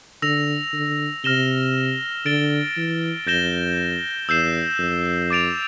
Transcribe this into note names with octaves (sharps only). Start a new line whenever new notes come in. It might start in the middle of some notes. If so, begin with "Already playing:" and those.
D3 E6 A#6 F7
D3
C3 F6 A#6 E7 G7
D3 A6 D7 G7
E3
F2 G6 A#6 E7 G7
E2 E6 G6 C7 E7
F2
D6 A6 D7 F7